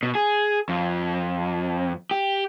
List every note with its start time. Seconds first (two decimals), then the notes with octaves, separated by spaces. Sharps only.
0.03 B2
0.15 G#4
0.69 F2
2.11 G4